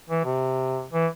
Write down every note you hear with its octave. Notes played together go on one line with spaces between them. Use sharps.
E3
C3
E3